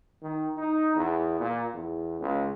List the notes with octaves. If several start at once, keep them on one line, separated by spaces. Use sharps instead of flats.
D#3
D#4
E2
A#2
E2
C#2